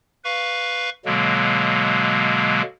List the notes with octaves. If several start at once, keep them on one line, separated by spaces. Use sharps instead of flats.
B4 F5 C#6
B2 D3 F#3 G#3 A#3